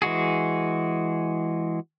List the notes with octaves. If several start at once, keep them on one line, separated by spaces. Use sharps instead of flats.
E3 G#3 F#4 G#4